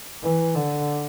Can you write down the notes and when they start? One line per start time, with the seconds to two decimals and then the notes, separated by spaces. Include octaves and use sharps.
0.23 E3
0.55 D3